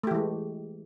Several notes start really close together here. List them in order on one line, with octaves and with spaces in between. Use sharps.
A3 G4 E3 G#3